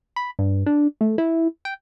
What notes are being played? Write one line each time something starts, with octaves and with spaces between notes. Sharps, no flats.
B5
G2
D4
A3
E4
G5